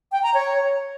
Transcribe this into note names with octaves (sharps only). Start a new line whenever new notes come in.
G5
A#5
C#5